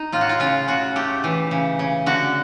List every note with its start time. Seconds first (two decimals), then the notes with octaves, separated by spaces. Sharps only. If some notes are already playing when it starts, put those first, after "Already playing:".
Already playing: D#4
0.12 A2 F4
0.21 F#4
0.29 F4
0.40 C#3 F4
0.68 C#3 F#4
0.96 A3 G4
1.24 E3
1.51 C#3
1.79 C#3
2.06 D3 F#4